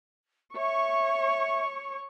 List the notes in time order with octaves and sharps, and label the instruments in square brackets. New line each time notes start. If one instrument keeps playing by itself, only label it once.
[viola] C#5 C#6 [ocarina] E5